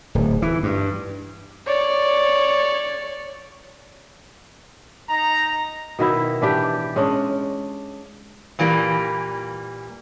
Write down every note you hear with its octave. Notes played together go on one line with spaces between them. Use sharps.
D1
E3
G2
C#5 D5
D#4 A#5
B2 D#3 E4 E5
E3 D4 G4
G#3 C#4 D4
A#2 E3 G3 A#3